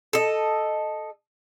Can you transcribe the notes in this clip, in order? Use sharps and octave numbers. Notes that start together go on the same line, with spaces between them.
A4 D#5